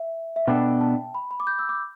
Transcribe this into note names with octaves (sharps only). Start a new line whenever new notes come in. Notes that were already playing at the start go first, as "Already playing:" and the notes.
Already playing: E5
E5
B2 B3 D4 A4 G5
A5
B5
B5
D6
G6
E6
D6